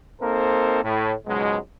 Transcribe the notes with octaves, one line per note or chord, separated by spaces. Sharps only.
A#3 C4 D#4 A4 A#4 C5
A2
C#2 G#2 B2 F#3 G#3